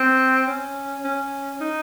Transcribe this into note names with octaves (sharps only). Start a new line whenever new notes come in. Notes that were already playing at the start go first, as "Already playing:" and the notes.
Already playing: C4
C#4
C#4
D#4